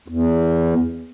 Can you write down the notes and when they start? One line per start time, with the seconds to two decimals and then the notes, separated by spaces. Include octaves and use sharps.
0.08 E2